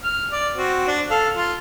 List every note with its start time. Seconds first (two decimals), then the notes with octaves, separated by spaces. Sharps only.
0.03 F6
0.32 D5
0.55 C4 F#4
0.87 D4
1.10 A4 F5
1.35 F4